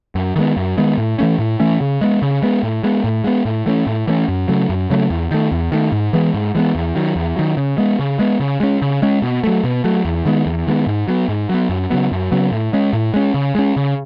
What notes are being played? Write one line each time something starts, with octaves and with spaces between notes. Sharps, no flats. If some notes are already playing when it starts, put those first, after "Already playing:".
F#2
D#3 G#3 B3
F#2
D#3 G#3 B3
A2
E3 A3 C#4
A2
E3 A3 C#4
C#3
G#3 B3
C#3
G#3 B3
A2
G#3 B3
A2
G#3 B3
A2
E3 A3 C#4
A2
E3 A3 C#4
F#2
C#3 F#3 A3
F#2
C#3 F#3 A3
E2
D#3 A3
E2
D#3 A3
G#2
E3 G#3 B3
G#2
E3 G#3 B3
E2
D#3 F#3
E2
D#3 F#3
C#3
G#3 B3
C#3
G#3 B3
C#3
G#3 C#4
C#3
G#3 C#4
B2
F#3 A3
B2
F#3 A3
E2
D#3 G#3 B3
E2
D#3 G#3 B3
G#2
F#3 B3
G#2
F#3 B3
F#2
C#3 F#3 B3
F#2
C#3 F#3 B3
A2
G#3 C#4
A2
G#3 C#4
C#3
G#3 C#4
C#3